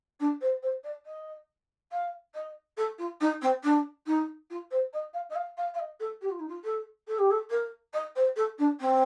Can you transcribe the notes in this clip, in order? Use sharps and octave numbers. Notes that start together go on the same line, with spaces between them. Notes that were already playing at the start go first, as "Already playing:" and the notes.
D4
C5
C5
D5
D#5
F5
D#5
A4
F4
D#4
C4
D4
D#4
F4
C5
D#5
F5
D#5
F5
F5
F5
D#5
A4
G4
F4
D#4
F4
A4
A4
G4
A4
A#4
D#5
C5
A4
D4
C4